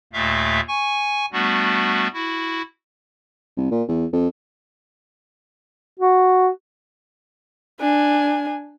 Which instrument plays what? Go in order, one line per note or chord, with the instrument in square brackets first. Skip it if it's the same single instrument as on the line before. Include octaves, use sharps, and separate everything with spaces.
[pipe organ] D#2 A#2 A3 E5 F5
G#5 C#6
G3 A3 B3 D4 F#4
E4 F#4
[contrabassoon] C2
A#2
E2
F2
[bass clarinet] F#4
[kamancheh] D4 G#5